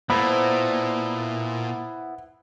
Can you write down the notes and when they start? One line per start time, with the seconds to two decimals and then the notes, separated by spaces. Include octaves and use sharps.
0.10 A#2 B3 E4 A4 C5 B5